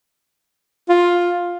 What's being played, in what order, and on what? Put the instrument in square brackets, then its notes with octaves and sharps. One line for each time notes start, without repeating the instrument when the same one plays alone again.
[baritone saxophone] F4